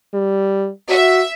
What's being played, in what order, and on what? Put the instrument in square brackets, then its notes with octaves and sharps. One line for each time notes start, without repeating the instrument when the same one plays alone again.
[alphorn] G3
[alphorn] F#4 [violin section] E5